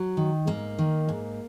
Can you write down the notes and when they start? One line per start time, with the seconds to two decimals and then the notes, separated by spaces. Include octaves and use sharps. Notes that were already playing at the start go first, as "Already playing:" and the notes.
Already playing: F#3
0.17 D#3
0.47 G#2 A#3
0.79 D#3
1.09 G#2